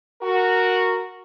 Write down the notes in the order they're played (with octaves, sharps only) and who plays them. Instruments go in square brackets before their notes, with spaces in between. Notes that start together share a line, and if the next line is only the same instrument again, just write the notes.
[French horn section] F#4 A#4